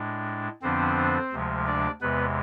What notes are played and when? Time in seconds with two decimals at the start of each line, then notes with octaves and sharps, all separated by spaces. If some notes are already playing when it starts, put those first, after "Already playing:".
Already playing: A2 G#3 D4
0.62 F2 D3 F3 B3 C4 D4 C5
1.32 D2 C3 F3 G#3
1.67 D4 D5
2.01 E2 C3 G#3 B3 B4